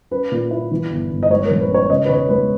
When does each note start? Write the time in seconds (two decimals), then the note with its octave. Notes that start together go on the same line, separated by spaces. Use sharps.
0.11 C#4 B4
0.32 A#2
0.51 E4
0.71 E3
0.91 G1
1.11 G1
1.23 D#5
1.30 G#3 C#5
1.45 A#4
1.51 A#1
1.61 B4
1.71 C#4 C#5
1.90 C#3 D#5
2.05 B4
2.09 E1 C#5
2.29 G#3 B4